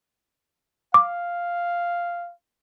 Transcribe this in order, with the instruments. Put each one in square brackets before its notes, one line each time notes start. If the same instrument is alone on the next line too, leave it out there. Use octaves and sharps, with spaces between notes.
[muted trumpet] F5 [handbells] D6